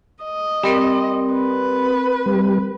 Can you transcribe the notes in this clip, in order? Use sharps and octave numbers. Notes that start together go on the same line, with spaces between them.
D#5
G3 C4 A#4
B4
G3